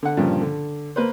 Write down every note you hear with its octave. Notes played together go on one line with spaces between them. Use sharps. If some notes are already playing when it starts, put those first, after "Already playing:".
D3 F#5
G2 A#2 C#3 F3
D3
A#3 B4 C5